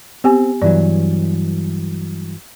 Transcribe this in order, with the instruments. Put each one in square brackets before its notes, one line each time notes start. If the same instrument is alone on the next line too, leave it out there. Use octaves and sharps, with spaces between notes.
[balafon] B3 G4 G#5 [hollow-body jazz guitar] C4
[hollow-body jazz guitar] G2 E3 F#3 [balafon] D5